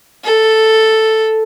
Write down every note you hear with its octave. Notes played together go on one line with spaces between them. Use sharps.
A4